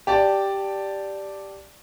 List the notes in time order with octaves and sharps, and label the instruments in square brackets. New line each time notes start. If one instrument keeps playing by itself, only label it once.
[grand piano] G4 D5 A5